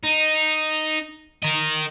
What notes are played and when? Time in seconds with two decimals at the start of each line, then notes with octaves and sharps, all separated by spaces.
0.04 D#4
1.43 A#4 D#5